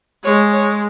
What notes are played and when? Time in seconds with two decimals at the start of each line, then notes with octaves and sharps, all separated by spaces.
0.24 G#3 C#5
0.53 C#5